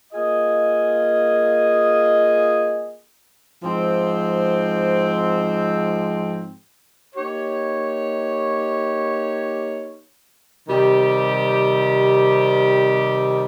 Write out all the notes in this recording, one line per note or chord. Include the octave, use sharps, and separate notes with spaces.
A#3 F4 G#4 D#5
G#2 F3 C4
A#3 D#4 G4 C#5
C3 D#3 G3 C4 G4